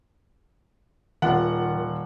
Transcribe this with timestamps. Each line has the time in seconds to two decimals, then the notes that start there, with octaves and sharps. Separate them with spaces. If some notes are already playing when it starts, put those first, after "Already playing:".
1.22 D#1 D#3 F4 F#5